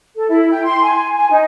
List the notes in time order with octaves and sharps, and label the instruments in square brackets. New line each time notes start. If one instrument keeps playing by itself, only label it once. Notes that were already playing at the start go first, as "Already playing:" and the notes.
[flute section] A4
E4
G5
C6
G#5
G#5
D#4